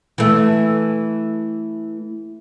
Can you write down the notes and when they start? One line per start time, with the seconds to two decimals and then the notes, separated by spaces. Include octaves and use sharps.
0.18 E3 A3